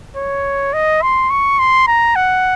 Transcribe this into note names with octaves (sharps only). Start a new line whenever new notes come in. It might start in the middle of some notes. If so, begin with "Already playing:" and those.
C#5
D#5
C6
C#6
C6
A#5
F#5